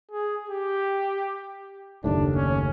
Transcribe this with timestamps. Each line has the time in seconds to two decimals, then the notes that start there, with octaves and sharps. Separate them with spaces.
0.11 G#4
0.50 G4
2.04 F#1 D#2 A2 D4
2.35 C#4